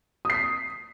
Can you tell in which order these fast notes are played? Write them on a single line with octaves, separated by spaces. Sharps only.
D#6 C7 B6